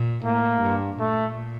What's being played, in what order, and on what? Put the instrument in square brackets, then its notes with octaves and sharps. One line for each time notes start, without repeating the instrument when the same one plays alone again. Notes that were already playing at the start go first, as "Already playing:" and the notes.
Already playing: [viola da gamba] A#2
[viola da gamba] A2 [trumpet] A#3
[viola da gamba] G2
[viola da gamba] A#2 [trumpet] A3